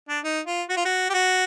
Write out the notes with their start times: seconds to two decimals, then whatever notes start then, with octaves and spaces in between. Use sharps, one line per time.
0.09 D4
0.24 D#4
0.46 F4
0.69 F#4
0.77 F4
0.85 F#4
1.10 G4
1.14 F#4